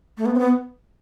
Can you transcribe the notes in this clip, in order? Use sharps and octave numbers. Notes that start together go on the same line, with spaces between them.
A3
B3
C4
B3